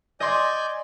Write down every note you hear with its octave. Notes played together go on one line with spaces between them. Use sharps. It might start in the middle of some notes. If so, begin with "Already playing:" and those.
D5 D#5 G#5 C6 G6 G#6